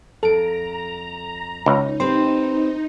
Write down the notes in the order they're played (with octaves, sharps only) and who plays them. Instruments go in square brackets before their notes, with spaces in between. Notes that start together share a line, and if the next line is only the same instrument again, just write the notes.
[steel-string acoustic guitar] F2 [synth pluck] A4 D7 [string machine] A#5
[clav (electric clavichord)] C#2 [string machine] D#4
[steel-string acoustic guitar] C4 G4 B4 [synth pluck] C6